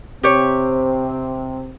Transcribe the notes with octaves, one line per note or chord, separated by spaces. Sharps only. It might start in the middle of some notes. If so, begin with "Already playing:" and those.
C3 C4 G4 C#5